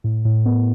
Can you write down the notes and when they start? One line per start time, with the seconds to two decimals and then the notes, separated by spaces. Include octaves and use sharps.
0.04 A2
0.25 A2
0.46 B3